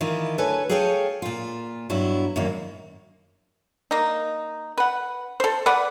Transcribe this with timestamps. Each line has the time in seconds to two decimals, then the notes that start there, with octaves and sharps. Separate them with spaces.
0.01 D#3 E3 E4 F4
0.38 D2 A4 B4 C#5 G#5
0.69 G#4 A4 C#5 F5 G5 G#5
1.22 A#2 F4
1.90 G2 F#3 B3 E4
2.36 F#2 A#2 D#3 E3 A#3
3.91 A#3 D#4
4.78 B4 F#5
5.40 A4 C5
5.66 B4 D5 F#5